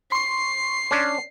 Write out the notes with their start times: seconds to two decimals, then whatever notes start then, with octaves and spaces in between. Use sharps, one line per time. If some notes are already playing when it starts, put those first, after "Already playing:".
0.12 C6 C#6 C7
0.91 C#4 D4